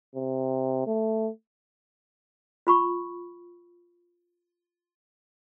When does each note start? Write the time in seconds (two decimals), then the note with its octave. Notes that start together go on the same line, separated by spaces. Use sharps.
0.15 C3
0.87 A3
2.67 F4 B5 C#6